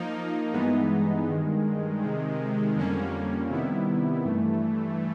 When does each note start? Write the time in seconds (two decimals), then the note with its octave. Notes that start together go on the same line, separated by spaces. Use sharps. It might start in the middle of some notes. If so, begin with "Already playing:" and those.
Already playing: F3 A#3 D#4
0.52 G2 E3 G#3 B3 D#4
1.27 G2 D#3 G#3
2.01 C3 D#3 G#3
2.75 F2 D3 G3 A#3 C#4
3.50 C3 D#3 G3 B3 E4
4.24 G2 E3 A3